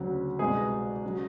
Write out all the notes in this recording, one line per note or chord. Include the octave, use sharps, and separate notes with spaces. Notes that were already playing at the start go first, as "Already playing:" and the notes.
Already playing: D2 C#3 F#3
C2 B2 G#3 G#4
C#3 F#3